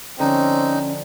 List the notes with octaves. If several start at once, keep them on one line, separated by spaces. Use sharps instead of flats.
D3 F3 C4 C#4 D#4